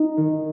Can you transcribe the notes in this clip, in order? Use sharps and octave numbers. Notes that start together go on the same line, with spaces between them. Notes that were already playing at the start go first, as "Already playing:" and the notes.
Already playing: D#4
D#3